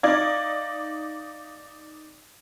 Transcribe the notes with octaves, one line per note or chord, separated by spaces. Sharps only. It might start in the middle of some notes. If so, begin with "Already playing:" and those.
D#4 D5 F5 G#6